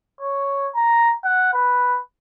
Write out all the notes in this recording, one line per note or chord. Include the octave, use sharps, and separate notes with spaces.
C#5
A#5
F#5
B4